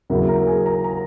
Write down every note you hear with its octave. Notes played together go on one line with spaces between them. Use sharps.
D#2 C#3 F#3 A#3 E4 E5
A#4 A#5
G#4 G#5
A#4 A#5
A#4 A#5